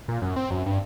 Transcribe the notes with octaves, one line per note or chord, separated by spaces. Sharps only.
A#2
F#2
C4
F#2
G2